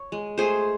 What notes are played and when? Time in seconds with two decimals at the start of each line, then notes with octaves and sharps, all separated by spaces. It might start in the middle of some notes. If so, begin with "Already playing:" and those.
Already playing: C#5
0.12 G#3
0.38 A3 G#4 C5